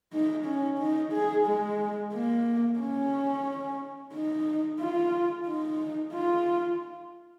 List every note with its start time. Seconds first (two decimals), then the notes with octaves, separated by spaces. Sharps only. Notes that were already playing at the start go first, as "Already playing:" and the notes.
0.13 D#4
0.46 C#4
0.79 D#4
1.13 G#4
1.47 G#3
2.13 A#3
2.80 C#4
4.14 D#4
4.80 F4
5.47 D#4
6.14 F4